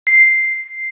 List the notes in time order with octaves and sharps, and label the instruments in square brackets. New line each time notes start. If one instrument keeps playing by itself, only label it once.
[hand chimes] C7